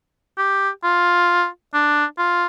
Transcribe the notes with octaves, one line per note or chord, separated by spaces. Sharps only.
G4
F4
D4
F4